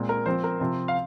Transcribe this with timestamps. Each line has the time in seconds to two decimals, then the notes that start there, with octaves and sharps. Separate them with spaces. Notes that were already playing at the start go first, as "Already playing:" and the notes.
Already playing: A#2 G#3 C4
0.09 A#4
0.25 F3 C4 C5
0.44 A#4
0.60 C3 F3 C4
0.88 F5